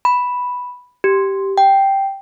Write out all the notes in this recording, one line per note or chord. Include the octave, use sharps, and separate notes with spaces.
B5
G4
G5